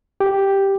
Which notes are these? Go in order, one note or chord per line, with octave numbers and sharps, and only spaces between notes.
G4